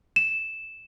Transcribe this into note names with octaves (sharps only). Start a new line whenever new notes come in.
E7